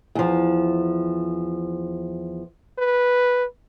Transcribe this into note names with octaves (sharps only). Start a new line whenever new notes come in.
E2 F3
B4